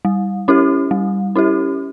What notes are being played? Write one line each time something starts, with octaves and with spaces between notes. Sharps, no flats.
G3
C#4 E4 G4
G3
C#4 E4 G4